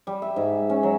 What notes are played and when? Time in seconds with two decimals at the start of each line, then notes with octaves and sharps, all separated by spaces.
0.07 G3
0.22 E5
0.36 G#2
0.70 C#4
0.83 F#3